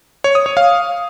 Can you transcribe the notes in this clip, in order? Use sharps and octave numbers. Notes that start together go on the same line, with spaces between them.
C#5
D#6
C#5
F5